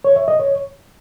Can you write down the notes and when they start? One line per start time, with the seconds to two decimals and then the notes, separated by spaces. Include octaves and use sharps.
0.04 C#5
0.16 E5
0.28 D#5
0.40 C#5